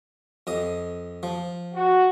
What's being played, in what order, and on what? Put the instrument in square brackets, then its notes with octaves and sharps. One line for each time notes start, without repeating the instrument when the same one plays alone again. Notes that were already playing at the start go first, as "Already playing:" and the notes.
[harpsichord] F2 D#5
F3
[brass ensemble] F#4